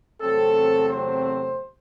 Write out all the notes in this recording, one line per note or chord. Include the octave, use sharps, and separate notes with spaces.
E2 C3 F#3 A3 C4 A4
C5